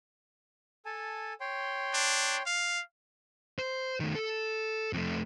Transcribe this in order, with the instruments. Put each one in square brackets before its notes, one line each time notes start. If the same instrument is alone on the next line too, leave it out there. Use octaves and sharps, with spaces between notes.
[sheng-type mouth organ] A4 G#5 A5
C#5 G5 C6
[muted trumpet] D4
F5
[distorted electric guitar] C5
D#3 A3
A4
F2 A3